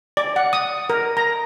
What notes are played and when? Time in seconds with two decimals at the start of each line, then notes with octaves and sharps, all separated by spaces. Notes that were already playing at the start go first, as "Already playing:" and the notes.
0.17 D5
0.36 F#5
0.53 D#6
0.90 A#4
1.17 A#5